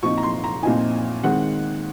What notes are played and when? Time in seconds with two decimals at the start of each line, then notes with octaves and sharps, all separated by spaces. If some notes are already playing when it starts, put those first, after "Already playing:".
0.03 A#2 F3 C4 D#4 C#6
0.17 A#5
0.23 C6
0.44 A#5
0.63 A#2 F3 C4 D#4 G#5
1.24 D#3 G#3 C4 F#5